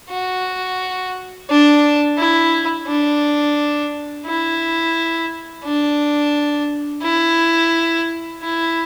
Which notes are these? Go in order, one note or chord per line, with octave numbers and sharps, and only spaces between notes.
F#4
D4
E4
D4
E4
D4
E4
E4